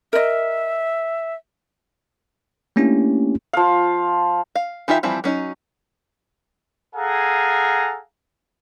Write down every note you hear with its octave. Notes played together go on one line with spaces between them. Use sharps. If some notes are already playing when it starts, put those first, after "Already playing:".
A#4 D#5 E5
A3 A#3 C#4 D4 E4 G4
F3 F5
F5
E3 D#4 F4 G4 E5
E3 F3 G3 C4 E4
F#3 C#4 D#4
G#4 A4 F5 F#5 G#5 A#5